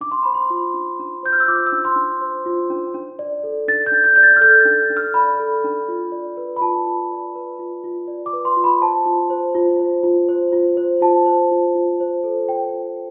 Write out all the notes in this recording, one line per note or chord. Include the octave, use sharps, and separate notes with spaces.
D4 D6
C6
C5 B5
C6
F4
D4
D4
C5 G6
F6
E6
F4 D6
E6
D4
C6
D4
C5
F4
D4
D4
D5
A4
D4 A6
G6
D4
G6
D5 G6
A6
F6
A4 G6
D4 A6
D4
F6
D5 B5
A4
D4
F4
D5
B4
B5
F4 A5
F4
D5
B4
F4
F4
D5
D6
B4
C6
F4
B5
C5 A5
F4
C5
F4
C5
F4
C5
F4
C5
F4 A5
C5
F4
F4
C5
A4
F4 G5
F4